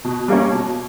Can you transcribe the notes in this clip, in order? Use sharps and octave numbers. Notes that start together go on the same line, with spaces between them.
B2
G3 A#3 C#4
B2